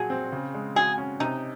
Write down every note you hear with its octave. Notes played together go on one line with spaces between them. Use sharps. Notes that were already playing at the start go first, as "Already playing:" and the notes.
Already playing: A#2 F#3 F#4 G#4
C4
C#3
G#3
F#4 G#4
C#4
C3 D#4